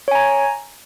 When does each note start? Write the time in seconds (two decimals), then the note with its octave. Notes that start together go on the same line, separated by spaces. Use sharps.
0.08 C#5
0.11 G#5
0.15 A#5